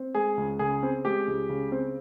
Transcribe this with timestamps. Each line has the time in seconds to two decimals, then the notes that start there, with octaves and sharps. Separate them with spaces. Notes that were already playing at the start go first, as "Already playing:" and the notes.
Already playing: C4
0.15 G#3 G#4
0.37 C#2
0.59 C#3 G#4
0.83 C4
1.05 G#3 G4
1.28 C#2
1.49 C#3
1.72 C4